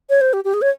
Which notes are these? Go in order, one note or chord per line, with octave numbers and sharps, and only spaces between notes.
C#5
C5
G4
G4
G#4
C#5